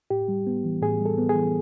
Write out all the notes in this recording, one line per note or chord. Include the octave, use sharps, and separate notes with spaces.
A2 G4
G3
B3
E3
A2 G#4
G3
A4
B3
G#4
E3